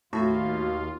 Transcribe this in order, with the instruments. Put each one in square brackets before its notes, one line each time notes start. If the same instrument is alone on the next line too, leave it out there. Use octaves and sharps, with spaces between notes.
[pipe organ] D#2 F4 [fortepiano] A2 [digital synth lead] F#4